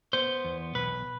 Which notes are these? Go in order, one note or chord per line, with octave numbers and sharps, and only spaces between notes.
B3 C5
E2
B1 B4